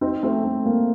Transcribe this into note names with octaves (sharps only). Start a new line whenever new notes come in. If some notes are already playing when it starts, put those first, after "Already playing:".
C4 D#4
A3 C4
A3
A#3